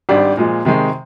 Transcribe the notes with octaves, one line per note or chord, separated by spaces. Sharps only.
G#1 G#2 G3 D4
A#2 F3 G#3
C3 D#3 G#3